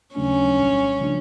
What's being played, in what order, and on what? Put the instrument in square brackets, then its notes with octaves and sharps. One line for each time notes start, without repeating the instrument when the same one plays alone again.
[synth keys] D#2 C#3 F#3 A3 D4 [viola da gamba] C#4
[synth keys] C2 A#2 G3
C#3 F3 A3 D4